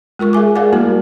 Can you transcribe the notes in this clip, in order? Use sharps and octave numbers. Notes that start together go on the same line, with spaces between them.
G#3 F4 A#4 C#6
G#4 E5 G#5 D6
G#4 A#4 D5 F5 F#5 G#5
G3 A3 A#3 E4 F#4 A#4